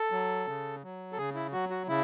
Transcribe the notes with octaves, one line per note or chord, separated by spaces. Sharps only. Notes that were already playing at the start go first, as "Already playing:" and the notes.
Already playing: A4
F#3
C#3
F#3
A4
C#3 G#4
E4
F#3 F#4
F#4
C#3 E4